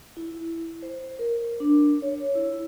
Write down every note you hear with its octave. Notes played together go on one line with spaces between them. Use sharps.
E4
C5
A#4
D4
C#5
E4